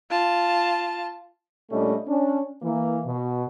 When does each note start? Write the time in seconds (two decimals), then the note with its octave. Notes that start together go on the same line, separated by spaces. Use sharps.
0.10 F4 A5
1.71 A#2 G3 A3 C#4 D4 D#5
2.08 C#4 D4
2.62 E3 A#3
3.05 B2